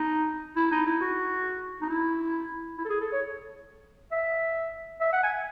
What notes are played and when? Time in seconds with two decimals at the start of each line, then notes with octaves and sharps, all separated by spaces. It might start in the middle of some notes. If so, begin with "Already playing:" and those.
Already playing: D#4
0.56 E4
0.71 D#4
0.86 E4
1.01 F#4
1.82 D#4
1.89 E4
2.78 E4
2.85 A4
2.90 G#4
3.01 A4
3.12 C#5
4.12 E5
5.01 E5
5.13 F#5
5.23 G#5